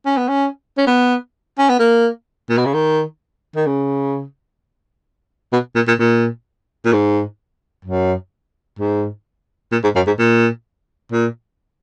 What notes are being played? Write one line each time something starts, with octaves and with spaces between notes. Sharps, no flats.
C#4
B3
C#4
C#4
B3
C#4
B3
A#3
A#2
B2
C#3
D#3
D#3
C#3
B2
A#2
A#2
A#2
A#2
G#2
F#2
G#2
A#2
G#2
F#2
G#2
A#2
A#2